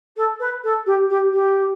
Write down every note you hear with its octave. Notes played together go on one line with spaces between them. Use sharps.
A4
B4
A4
G4
G4
G4